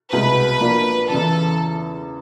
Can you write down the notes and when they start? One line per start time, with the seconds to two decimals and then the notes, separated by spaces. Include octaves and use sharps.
0.12 C2 B2 G#3 B4
0.60 F3 A#3 D4
1.09 E2 C#3 E3 A4